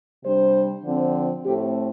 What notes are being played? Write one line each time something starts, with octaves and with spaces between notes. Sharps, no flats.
C3 G3 D4 C5
D3 F3 C4
A2 A3 C4 G4